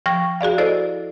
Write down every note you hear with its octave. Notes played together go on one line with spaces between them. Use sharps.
F3 G5 C#6 F6 A#6
F#4 G#4 D5 F5
E4 A4 C5 D5 D#5